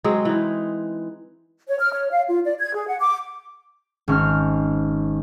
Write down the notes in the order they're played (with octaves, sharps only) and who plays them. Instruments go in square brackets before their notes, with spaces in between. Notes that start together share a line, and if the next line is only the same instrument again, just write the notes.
[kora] F#3 G#3 C4 G#4
E3 D#4
[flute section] C#5
F6
C#5
F5
F4
D5
G#6
G#4
F#5
D6
[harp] G#1 C#4 C5 F6